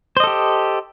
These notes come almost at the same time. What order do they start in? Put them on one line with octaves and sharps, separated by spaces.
C5 D#5 A4 G4